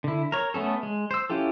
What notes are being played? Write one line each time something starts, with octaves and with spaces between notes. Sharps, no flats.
D3 E4
A#4 C#5
A3 B3 C#4 A4
G#3
C5 E6
C#4 E4 F4 G4 A4